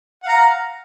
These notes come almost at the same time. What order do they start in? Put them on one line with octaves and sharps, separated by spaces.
F#5 F5 A#5